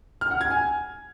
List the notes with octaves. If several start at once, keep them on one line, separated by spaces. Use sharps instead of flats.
F6
F#5
G#6
G#5